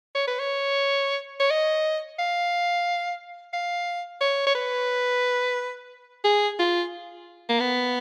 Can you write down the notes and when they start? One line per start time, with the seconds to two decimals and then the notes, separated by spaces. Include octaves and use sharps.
0.15 C#5
0.27 B4
0.39 C#5
1.40 C#5
1.50 D#5
2.19 F5
3.53 F5
4.21 C#5
4.47 C#5
4.55 B4
6.24 G#4
6.59 F4
7.49 A#3
7.60 B3